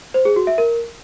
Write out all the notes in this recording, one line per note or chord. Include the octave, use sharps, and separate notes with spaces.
C5
G#4
F#4
E5
A#4